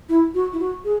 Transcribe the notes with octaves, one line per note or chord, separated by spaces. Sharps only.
E4
F#4
E4
F#4
G#4